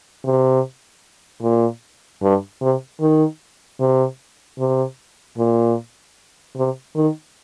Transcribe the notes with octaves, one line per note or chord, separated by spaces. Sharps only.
C3
A#2
G2
C3
D#3
C3
C3
A#2
C3
D#3